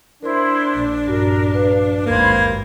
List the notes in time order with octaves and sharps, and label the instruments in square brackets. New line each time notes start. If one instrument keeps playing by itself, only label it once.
[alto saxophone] D4 [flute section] E4 C5 [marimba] A#4 C6
[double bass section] A#1
[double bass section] A#1 [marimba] G2 F#4 [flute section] A#4
[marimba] B4 [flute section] F5
[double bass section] G#1 D#2 [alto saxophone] A#3 [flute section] C5 B5 G#6